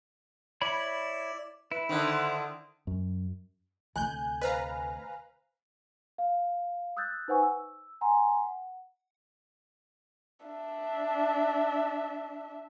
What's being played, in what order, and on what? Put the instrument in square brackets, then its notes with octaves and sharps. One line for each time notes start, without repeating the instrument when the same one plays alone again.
[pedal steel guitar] E4 C#5 B5 [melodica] D5
[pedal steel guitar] E4 [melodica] B4
[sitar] D3 D#3 [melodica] C5
[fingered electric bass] F#2
[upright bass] D2 C3 [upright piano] G#5 [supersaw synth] F#6 G6
[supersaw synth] B4 F5 A#5 [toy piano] C5 D#5
[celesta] F5
D#6 E6 F#6 G6 A6
D#4 B4 C5 F#5 G#5 C#6
E6
F#5 G#5 A#5 C6
F#5
[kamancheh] D4 E5